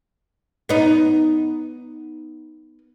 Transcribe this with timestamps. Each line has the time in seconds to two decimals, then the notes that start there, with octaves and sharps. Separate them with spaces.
0.69 B3 D#4